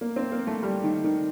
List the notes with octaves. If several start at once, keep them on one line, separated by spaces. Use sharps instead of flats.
A#3
C4
A#3
A3
G3
D#3
D#3